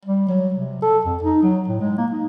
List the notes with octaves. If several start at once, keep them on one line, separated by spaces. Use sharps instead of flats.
G3
F#3
C3
A4
F2
D#4
F#3
A2
G#3
A#3
D#4